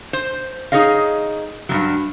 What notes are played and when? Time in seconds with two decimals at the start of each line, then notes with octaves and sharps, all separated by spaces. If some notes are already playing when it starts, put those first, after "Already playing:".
0.13 C5
0.72 D#4 G#4 C#5 D#5 F5
1.69 G2 B2 F#3